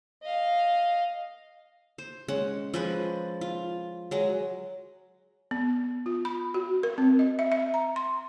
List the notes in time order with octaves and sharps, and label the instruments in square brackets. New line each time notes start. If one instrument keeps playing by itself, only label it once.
[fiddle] D#5 F5
[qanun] C5
G#3 C#4 F#5
F3 G#3 B4
F4
F#3 G#3 D#5
[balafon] B3
F4
B5
F#4
A#4
C4
D#5
E5
E5
A#5
C6